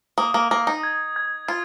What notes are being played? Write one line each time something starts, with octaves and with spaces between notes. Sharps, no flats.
A#3 D#6
A#3
A#3 D#6
D#4
G#6
G#6
F4 G#6